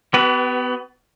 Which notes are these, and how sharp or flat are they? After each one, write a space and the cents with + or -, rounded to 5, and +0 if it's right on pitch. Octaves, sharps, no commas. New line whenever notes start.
B3 +25 G4 -45 B4 +0